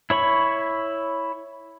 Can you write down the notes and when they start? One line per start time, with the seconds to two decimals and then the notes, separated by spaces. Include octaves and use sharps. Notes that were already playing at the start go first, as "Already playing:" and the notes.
0.10 E4 C#5 B5 C#6